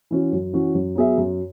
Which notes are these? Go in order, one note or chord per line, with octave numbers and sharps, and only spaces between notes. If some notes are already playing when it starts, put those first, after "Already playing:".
E3 C#4 F#4
F#2
E3 C#4 F#4
F#2
F#3 B3 G#4 E5
F#2